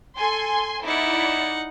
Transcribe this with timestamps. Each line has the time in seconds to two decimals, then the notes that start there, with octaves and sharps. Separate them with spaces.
0.18 A4 G#5 C6
0.84 D#4 E4 D5 F#5